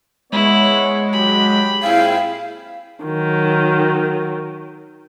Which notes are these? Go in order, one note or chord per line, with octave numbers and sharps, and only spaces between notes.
G#3 B3 E4 C#5
F#3 G4 B5
A#2 C4 E4 G#4 F5 G5
D#3 F#3